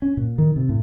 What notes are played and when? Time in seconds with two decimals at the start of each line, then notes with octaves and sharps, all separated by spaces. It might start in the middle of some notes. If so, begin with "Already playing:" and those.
0.02 C#4
0.17 A#2
0.38 D#3
0.56 C3
0.69 A2